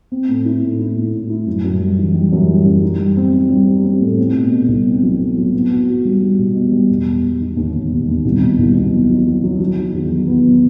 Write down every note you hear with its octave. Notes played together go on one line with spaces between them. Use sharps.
C4
A2
E4
A2
E4
A2
A2
E4
F#2
F#2
G3
E3
G3
F#2
G3
F#2
D#4
G3
C4
C4
G3
C4
C4
A2
C4
B2
B2
C2
C4
F#3
B2
F#3
B3
F#4
F#4
G3
G3
B2
B2
G3
E1
E1
E1
D#3
D#2
D#2
E1
D#2
C2
B2
C2
B2
F#3
F#3
F#3
F#3
F#3
D#3
E2
F#3
B3
F#3